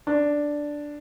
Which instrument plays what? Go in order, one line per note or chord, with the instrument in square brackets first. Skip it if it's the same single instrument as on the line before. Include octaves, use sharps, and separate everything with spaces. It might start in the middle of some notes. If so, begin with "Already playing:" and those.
[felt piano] D4